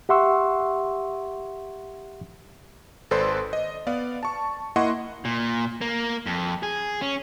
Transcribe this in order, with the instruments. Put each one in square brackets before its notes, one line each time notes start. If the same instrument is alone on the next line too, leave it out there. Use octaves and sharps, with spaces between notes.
[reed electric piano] G4 E5 F#5 C6 C#6 E6
[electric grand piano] G#1 A4 B4 C5 D5 C6
D#5
B3 D5 F5
A5 C#6
A#3 E4 D#5 F#5 C6 C#6
[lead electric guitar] A#2
A#3
F2
G#4
C#4